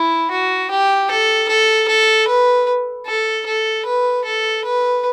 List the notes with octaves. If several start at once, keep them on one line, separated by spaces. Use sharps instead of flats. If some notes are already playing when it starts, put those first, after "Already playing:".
Already playing: E4
F#4
G4
A4
A4
A4
B4
A4
A4
B4
A4
B4